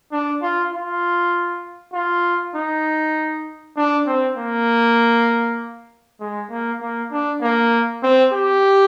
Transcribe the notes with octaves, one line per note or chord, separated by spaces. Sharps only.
D4
F4
F4
F4
D#4
D4
C4
A#3
G#3
A#3
A#3
D4
A#3
C4
G4